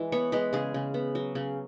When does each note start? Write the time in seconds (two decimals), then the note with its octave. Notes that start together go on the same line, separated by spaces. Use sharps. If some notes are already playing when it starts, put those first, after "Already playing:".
Already playing: E3 G#3
0.12 B3 C#5
0.32 G#3 B4
0.53 C#3 G#4
0.74 C#3
0.94 B3
1.15 F#3
1.35 C#3